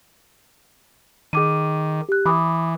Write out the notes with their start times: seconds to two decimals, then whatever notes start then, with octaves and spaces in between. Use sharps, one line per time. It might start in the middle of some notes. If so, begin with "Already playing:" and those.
1.33 D#3 G#4 D6 D#7
2.09 G4 F#6
2.26 E3 B5 D6 D#6